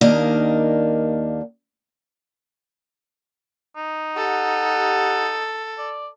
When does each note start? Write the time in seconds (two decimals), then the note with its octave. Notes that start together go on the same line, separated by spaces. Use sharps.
0.01 D#2 D#3 A#3 D4 D#5
3.76 D#4
4.17 G4 A4 F#5
5.78 D5